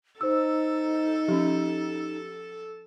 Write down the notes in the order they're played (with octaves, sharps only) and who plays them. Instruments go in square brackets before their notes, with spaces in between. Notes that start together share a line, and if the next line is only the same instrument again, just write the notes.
[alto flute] D#4 [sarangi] A4 [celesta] C5 E6
[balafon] F3 C#4 [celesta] G4